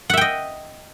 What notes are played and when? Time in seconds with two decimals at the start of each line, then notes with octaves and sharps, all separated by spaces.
0.10 F#5
0.13 E5
0.17 G5
0.21 D#5